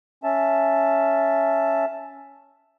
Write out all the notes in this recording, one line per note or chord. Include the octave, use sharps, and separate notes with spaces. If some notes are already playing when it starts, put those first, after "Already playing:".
C#4 E5 A5